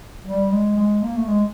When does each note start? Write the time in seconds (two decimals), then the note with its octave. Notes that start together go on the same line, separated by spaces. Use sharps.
0.25 G3
0.51 G#3
0.77 G#3
1.03 A#3
1.16 A3
1.28 G#3